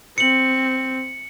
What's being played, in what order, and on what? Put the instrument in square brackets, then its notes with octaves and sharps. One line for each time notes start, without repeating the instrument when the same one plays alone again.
[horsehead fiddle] C4 [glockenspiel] C#7 F#7